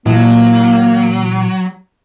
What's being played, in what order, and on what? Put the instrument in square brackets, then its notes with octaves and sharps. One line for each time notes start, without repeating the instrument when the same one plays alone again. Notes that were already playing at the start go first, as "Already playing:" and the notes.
[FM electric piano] A#2 E3 [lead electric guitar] F#3 [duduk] A#3